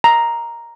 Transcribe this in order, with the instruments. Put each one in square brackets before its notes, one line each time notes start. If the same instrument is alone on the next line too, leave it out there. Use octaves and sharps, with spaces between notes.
[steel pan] A#5